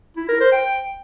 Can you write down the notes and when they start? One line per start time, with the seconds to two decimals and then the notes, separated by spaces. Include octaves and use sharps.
0.17 E4
0.29 A#4
0.40 C5
0.52 G5